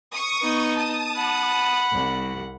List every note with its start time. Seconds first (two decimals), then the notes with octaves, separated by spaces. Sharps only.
0.13 C#6 D#6
0.41 B3 D#4
0.76 A5 D#6
1.17 F#5 B5
1.91 C2